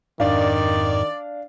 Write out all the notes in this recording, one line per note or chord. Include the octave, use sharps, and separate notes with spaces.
F2 G#2 D#3 D4 D5 F5